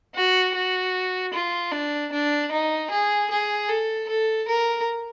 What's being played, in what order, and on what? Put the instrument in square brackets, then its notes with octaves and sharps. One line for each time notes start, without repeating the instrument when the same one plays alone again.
[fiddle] F#4
F#4
F4
D4
D4
D#4
G#4
G#4
A4
A4
A#4